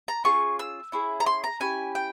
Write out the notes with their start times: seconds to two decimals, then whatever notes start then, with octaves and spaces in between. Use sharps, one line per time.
0.08 A#5
0.24 C#4 F4 G#4 C#6
0.59 E6
0.92 C#4 E4 G#4
1.20 A#5
1.26 C6
1.44 A#5
1.60 C#4 E4 G4 G#5
1.95 G5